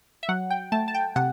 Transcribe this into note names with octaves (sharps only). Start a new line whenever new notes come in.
E5
F#3 F#5
G5
A3 A5
A5
G5
C3 F#5